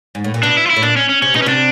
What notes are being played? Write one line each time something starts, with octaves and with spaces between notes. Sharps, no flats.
G#2
A2
A#2
B2 D4
E4
F4
E4
A2
A#2 D4
C#4
C#4
C3 C#4
B2 D#4
C#4
C3 D4